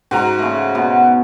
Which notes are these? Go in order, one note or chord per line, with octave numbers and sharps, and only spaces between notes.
G#2 F#4 A#5
C#3 A3
B2